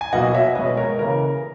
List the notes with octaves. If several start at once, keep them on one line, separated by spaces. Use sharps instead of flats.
G#5
B2 F#3 A#3 D#5 F#5
C#5 E5
B2 G#3 B4 D#5
A#4 C#5
C#3 E3 A#3 A#4